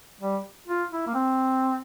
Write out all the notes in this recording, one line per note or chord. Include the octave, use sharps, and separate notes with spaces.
G3
F4
E4
A#3
C4